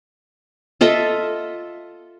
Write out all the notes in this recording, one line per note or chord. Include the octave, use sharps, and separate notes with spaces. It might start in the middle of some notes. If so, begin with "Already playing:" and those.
F4 A4 D#5 E5